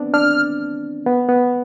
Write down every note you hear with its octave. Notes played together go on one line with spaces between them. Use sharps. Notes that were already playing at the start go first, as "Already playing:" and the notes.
Already playing: B3 C4 D4
D4 F6
B3
B3